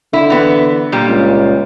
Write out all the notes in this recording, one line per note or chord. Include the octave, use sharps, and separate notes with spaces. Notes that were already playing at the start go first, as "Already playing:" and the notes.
D3 E4
E3 B3
A#2 G3
C#2